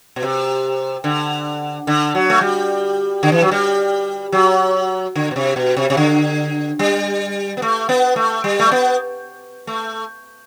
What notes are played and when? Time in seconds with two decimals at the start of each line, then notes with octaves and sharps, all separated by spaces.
0.16 B2
0.22 C3
1.04 D3
1.87 D3
2.15 F#3
2.30 A3
2.41 G3
3.23 D3
3.32 E3
3.42 F#3
3.51 G3
4.32 F#3
5.16 D3
5.31 B2
5.36 C3
5.56 B2
5.77 C3
5.90 C3
5.97 D3
6.79 G3
7.57 B3
7.62 A3
7.89 B3
8.16 A3
8.44 G3
8.59 A3
8.71 B3
9.67 A3